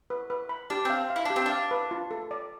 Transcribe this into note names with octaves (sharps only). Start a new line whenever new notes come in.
B4
B4
B5
D4 G4
C4 F5
F5
E4
D4 G4
C4
D4 F5
B4
F4
A4
D5